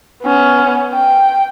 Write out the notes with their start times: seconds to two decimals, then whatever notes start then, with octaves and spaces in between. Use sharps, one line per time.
0.23 B3 C#4
0.92 G5